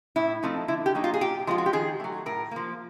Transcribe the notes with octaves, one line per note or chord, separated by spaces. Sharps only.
A2 E4
F3 A3 C4 D#4
D3 E4
G4
F#3 A#3 D#4
F4
G#4
A#2 G4
F3 G#3 B3 F4
F#4
G4
D#3 G#4
F#3 A3
A2 A#4
F3 A#3